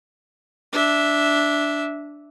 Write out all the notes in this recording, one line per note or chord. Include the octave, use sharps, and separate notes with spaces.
D4 E5